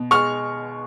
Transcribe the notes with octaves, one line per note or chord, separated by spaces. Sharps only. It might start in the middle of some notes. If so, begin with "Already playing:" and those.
Already playing: B2
G#3 C#6 F6